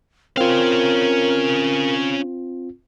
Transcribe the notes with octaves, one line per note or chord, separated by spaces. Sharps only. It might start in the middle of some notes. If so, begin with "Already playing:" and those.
C4 C#4 F4 A#4 F5